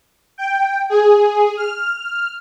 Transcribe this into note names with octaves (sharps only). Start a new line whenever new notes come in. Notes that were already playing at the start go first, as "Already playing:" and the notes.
G5
G#4
F6